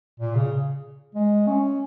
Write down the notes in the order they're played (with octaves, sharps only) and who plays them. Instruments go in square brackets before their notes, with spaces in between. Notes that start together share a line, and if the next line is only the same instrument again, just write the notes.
[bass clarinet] A#2
C#3
G#3
C#4